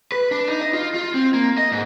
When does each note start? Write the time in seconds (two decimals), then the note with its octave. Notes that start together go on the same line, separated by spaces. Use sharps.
0.12 B4
0.31 D4
0.48 D#4
0.61 D#5
0.73 F4
0.94 F4
1.14 C4
1.34 A#3
1.58 D#5
1.72 G#2